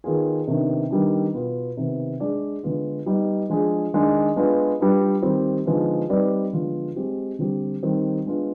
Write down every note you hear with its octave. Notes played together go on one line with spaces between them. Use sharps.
D#3 B3 F4 G#4
C3 D#3 B3 D4
D#3 G3 B3 D4
B2 B3 F4
C3 D#3 B3
G#3 D4 G#4 D5
D3 G#3 B3 F4
G3 B3 D#4
F3 G#3 D4 G#4
D#3 G#3 D4
G#3 B3 D4 F4
G3 D4 F4 B4
D#3 G3 C4 G4
D3 F3 G#3 B3 D#4
G3 C4 D#4 B4 D5
D3 F3 G#3 B3 F4
G#3 C4 G4
D3 G3 C4 G4
D#3 G3 C4
G#3 B3 D4 F4